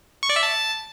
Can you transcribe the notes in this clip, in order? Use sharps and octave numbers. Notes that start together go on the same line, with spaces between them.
C#6
D5
E5
A5